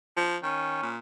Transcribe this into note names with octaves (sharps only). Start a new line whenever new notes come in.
F3
D#3 C#4
A#2